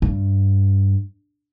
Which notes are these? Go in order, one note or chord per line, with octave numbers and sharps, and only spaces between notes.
G2